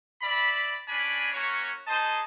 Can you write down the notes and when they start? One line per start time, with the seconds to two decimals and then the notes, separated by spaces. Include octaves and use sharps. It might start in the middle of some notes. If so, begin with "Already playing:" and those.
0.22 D5 E5 B5
0.88 C#4 D4 D5 G#5 B5
1.33 A#3 C#4 F#4 C#5
1.87 D#4 G#4 C5 D#5 A5